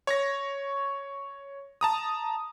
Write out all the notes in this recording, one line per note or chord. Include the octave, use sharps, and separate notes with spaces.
C#5 C#6 A#6
A5 A#5 D#6